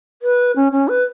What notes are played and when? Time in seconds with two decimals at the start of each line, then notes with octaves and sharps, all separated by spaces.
0.22 B4
0.56 C#4
0.72 C#4
0.88 B4